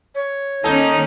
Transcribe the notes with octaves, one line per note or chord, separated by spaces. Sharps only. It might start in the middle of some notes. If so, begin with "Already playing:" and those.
C#5
D#3 A#3 C#4 D#4 A4